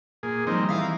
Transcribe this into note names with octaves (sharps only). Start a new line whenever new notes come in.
A#2 G#4
D#3 F3 G3 A#3 C4 D#4
E3 E5 F5 A#5